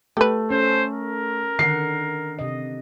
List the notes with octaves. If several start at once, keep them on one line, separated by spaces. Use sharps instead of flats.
A3 G4 B4
C#4 A4 C5
A#4
D3 D#3 F#5 C7
C3 D#5